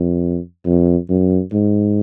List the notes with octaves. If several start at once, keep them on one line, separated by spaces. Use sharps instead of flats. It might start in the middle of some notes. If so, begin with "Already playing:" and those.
Already playing: F2
F2
F#2
G#2